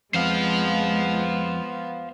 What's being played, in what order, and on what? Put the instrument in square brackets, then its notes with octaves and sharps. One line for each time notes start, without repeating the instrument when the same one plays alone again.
[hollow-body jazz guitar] F2 [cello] G#3 [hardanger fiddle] B3 [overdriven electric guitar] C5 F5